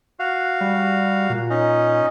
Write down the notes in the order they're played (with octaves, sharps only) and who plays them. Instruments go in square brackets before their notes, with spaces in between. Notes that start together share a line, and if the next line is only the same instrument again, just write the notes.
[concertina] F#4 F5
[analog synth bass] G3
A#2
[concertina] C#4 D#4